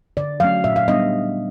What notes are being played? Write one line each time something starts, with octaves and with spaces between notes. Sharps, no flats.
D3 D5
F#3 A3 C#4 F5
A#2 E5
F5
G3 B3 D4 D#5